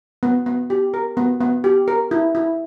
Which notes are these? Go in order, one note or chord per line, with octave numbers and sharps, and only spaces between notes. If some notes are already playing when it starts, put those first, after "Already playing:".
B3
B3
G4
A#4
B3
B3
G4
A#4
E4
E4